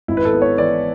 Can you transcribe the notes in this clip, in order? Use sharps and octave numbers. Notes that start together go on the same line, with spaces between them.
G#1 E4
B4
A4
B3
C#5
E3 D5